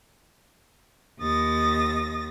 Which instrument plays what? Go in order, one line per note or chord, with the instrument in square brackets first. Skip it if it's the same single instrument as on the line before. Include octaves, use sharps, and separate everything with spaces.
[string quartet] D#2 D#6 A6 A#6